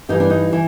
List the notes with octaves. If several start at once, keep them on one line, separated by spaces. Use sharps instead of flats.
G2 E3 G3 D#4
D4
D#4
E3